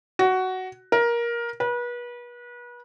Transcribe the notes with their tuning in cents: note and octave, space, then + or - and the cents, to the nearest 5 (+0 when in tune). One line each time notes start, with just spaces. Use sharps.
F#4 +10
A#4 +15
B4 -35